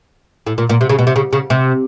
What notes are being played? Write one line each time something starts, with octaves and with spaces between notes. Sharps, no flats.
A2
A#2
A#2
C3
C#3
B2
C3
C#3
C#3
C3